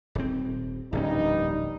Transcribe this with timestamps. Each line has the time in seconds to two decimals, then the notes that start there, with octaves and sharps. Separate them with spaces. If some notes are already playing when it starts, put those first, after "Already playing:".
0.15 D#1 C4
0.93 D1 A#1 G2 G3 C#4 D#4